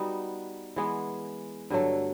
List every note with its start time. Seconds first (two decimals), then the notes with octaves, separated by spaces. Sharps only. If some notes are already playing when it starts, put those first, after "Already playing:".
Already playing: G3 B3 D#4 F#4
0.76 E3 G#3 B3
1.70 G2 D3 F#3 A3